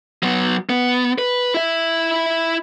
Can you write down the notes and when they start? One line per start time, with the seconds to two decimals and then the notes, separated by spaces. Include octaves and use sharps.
0.23 F#3 B3
0.69 B3
1.18 B4
1.54 E4 E5